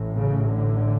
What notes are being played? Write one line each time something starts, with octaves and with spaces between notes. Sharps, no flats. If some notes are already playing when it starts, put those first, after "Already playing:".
Already playing: A1 A2
C#3
D3